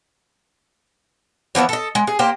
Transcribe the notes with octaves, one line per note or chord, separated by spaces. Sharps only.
E3 F3 B3 E4
A4 D#5
G#3
G#4
A#3 G4 C5